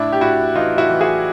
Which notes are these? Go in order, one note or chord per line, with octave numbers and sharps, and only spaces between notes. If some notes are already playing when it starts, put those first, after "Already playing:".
Already playing: A2 D4 E4
G4
A2 E4 F#4
E3 D#4 F4
E4 F#4
E3
F#4 G#4